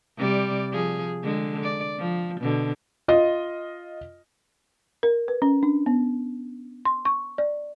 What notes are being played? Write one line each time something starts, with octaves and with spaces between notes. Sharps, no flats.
C3 G3 D5
F3 G#4
D3 G#3
D5
F3
B2 D3
F4 D#5
A#4
B4
C#4
D4
B3
C6
C#6
D5